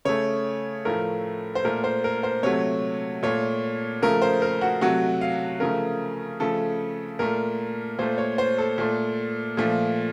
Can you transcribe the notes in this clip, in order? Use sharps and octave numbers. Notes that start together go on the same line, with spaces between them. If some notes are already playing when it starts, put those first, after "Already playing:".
C#3 A3 C#5
A2 F3 A3 A#4
C5
A#2 A3 A#4
C5
A#4
C5
C3 F#3 A3 C#5
A#2 A3 C#5
C#3 F3 A3 A#4
C5
A#4
F#4
C3 F#3 A3 F#4
F5
C#3 F3 A3 A#4
C#3 F3 A3 A4
A#2 A3 A#4
A#2 A3 C5
C#5
C5
A4
A#2 A3
A#2 F3 A3